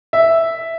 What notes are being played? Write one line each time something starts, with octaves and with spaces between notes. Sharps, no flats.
E5